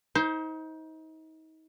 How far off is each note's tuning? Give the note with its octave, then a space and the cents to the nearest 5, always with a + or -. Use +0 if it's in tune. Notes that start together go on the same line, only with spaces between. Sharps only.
D#4 +35 C5 +0